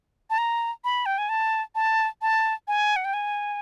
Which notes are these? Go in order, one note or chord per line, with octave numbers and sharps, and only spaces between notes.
A5
A#5
B5
G5
G#5
A5
A5
A5
G#5
F#5
G5
G#5